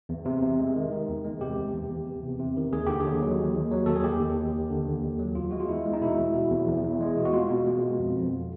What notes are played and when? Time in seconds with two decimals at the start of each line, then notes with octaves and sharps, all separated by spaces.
0.09 E2
0.25 C3
0.42 C3
0.59 G#3
0.76 D#3
0.92 D#3
1.08 E2
1.24 G#3
1.41 C3 G4
1.58 E2
1.74 E2
1.91 E2
2.07 E2
2.23 C3
2.39 C3
2.57 D#3
2.73 D#2 G#4
2.86 D3 G4
3.00 G#4
3.06 D#2
3.22 F#3
3.39 D#2
3.55 D#2
3.71 F#3
3.86 D#2 A4
3.96 G#4
4.04 D#2 G4
4.20 D#2
4.38 D#2
4.54 D#2
4.70 D3
4.87 D#2
5.02 D#2
5.19 F#3
5.35 E2 F4
5.51 G#3 F#4
5.60 F4
5.68 E2 E4
5.86 G#3
5.93 D#4
6.01 B2 E4
6.18 E2
6.34 B2
6.51 E2
6.68 E2
6.84 E2
7.01 G#3
7.17 B2
7.25 F#4
7.33 B2 F4
7.50 B2
7.66 G#3
7.83 B2
7.99 F2
8.16 F2